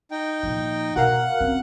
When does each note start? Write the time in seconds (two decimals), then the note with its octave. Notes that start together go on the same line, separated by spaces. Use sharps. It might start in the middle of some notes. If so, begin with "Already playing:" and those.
0.11 D#4 G5
0.43 A#2 F3
0.96 B2 F#4 A#4 F5 F#5 F#6
1.41 C4 C#4